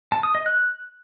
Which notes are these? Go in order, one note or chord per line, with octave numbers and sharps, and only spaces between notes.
A5
D#6
D#5
F#6